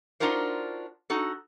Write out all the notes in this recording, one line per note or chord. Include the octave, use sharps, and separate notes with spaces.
D4 D#4 F4 F#4 A#4 C5
D#4 F#4 A4